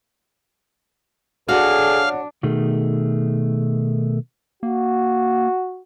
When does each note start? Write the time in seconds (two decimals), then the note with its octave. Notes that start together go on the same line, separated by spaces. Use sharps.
1.49 D4 F#4 G#4 A4 C#5 F5 F#5
2.43 B2 D#3 A3 G#4
4.63 A#3 F#4